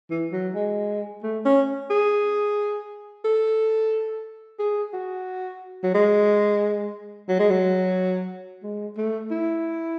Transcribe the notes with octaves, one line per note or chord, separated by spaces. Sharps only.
E3
F#3
G#3
A3
C#4
G#4
A4
G#4
F#4
F#3
G#3
F#3
G#3
F#3
G#3
A3
E4